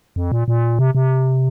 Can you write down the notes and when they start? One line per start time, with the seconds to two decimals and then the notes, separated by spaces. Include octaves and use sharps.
0.16 F2
0.32 A#2
0.48 A#2
0.79 C3
0.95 C3